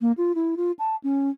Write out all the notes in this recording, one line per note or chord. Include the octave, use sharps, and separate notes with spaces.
A#3
F4
E4
F4
A5
C#4